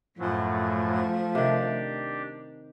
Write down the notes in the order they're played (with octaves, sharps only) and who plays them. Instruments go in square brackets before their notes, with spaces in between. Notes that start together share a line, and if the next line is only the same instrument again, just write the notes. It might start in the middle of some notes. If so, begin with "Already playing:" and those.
[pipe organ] F#2 A2 F#3 [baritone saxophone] F3 [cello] A3
[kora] C3 D#3 [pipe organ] D4 G4